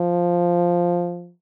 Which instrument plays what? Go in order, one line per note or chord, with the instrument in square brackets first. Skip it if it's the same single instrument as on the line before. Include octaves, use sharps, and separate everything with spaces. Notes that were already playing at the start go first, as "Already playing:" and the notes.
Already playing: [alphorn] F3